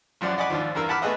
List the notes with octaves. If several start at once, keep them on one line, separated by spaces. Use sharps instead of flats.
A1 F#2 F3 D5 F#5
D5 D#5 F#5 G#5 B5 D6
D#2 G#2 F3 D4
E2 G2 A#4 E6
F#5 A5 B5 D6 E6 F6
A3 B3 G#4 B4 D#5